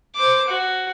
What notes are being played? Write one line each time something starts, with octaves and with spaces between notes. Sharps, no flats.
C5 D6
F#4